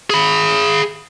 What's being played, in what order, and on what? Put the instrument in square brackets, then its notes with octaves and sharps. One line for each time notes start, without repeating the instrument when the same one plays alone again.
[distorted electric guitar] G#4 B5